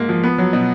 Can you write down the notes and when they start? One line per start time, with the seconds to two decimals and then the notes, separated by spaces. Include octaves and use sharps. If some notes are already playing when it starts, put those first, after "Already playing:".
Already playing: G#2 A#3
0.09 F3
0.24 B3
0.38 F#3
0.53 B2